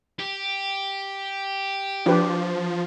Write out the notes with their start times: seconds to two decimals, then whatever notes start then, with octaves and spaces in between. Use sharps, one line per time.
0.19 G4
2.06 F3 D4 G4 B4